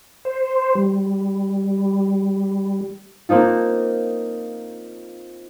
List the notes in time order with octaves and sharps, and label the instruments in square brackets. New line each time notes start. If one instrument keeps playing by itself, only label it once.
[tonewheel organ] C5
G3
[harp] A#3 C4 D#4 F4